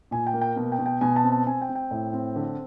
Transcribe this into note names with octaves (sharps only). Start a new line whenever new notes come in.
A#2 G#5
G5
A#3
G5
B2
G5
B2
G5
B2 G#5
A5
C4
A5
C4 G#5
G5
C4
G5
A2
C4
D3